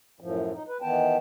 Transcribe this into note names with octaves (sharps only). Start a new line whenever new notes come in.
F#2 A2 F3
D#4
B4
D#3 E3 B3 G5 A5